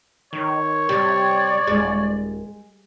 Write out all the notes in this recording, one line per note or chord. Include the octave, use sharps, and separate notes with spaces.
D#3 C#5
C3 G3 D5
D#1 G#3